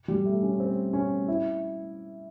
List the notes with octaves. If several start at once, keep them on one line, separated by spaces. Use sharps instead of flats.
G3
A3
C#4
C4
C#4
E4